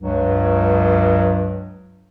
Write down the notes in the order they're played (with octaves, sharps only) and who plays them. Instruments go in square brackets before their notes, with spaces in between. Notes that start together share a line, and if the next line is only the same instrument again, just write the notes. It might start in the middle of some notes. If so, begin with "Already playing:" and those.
[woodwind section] C#2 G2 F#3